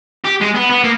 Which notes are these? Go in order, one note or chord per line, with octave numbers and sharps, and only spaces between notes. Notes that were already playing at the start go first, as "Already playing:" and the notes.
G4
G#3
B3
B3
A#3